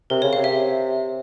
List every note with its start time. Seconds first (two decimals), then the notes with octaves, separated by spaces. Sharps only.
0.10 C3 A#4
0.22 C#3 C#5
0.33 F5
0.36 C3
0.44 E5